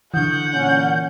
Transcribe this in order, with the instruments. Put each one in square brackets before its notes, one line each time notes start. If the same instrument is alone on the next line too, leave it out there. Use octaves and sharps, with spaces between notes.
[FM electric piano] D3 E3 [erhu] F#5 [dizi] G6
[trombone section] A#2 C#4